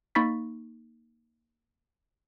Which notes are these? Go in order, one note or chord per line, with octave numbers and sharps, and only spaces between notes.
A#3 D#4 B5 C#6 A6 B6